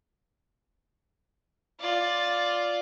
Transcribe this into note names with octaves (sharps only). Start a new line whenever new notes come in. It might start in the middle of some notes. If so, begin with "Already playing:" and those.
F4 D5